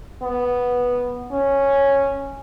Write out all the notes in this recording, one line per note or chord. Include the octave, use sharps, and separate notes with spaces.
B3
C#4